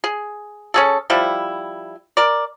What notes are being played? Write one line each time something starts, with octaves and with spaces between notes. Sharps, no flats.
G#4
C#4 G#4 A4
F3 G3 E4
A#4 D5